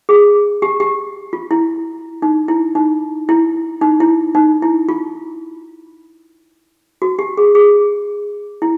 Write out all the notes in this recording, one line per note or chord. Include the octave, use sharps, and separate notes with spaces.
G#4
G4
G4
F4
E4
D#4
E4
D#4
E4
D#4
E4
D#4
E4
F4
F#4
G4
G#4
G#4
E4